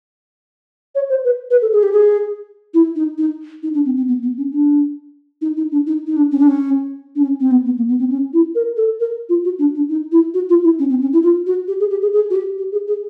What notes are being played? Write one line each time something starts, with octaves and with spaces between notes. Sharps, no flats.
C#5
C5
B4
B4
A4
G#4
G4
G#4
E4
D#4
D#4
D#4
D4
C4
C4
B3
B3
C#4
D4
D#4
D#4
D4
D#4
D#4
D4
C#4
D4
C#4
D4
C#4
C4
B3
B3
A#3
B3
C4
C#4
E4
A#4
A4
A#4
F4
F#4
D4
D4
D#4
E4
F#4
F4
E4
C#4
C4
C#4
E4
F4
F#4
G4
G#4
G4
G#4
G#4
F#4
G4
G4
G#4
G#4